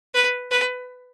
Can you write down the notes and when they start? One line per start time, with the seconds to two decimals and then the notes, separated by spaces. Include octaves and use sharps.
0.14 B4
0.51 B4